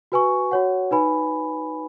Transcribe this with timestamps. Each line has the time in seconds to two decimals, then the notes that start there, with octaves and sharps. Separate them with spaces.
0.12 F#4 B4 G#5 C#6
0.51 F#4 C#5 F#5
0.91 D#4 B4 G#5 B5